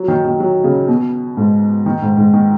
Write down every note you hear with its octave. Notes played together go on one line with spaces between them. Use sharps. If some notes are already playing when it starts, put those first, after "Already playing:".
Already playing: F#3
D#3
D#3
F#3
C#3
B2
G#2
D#3
G#2
G#2
D#3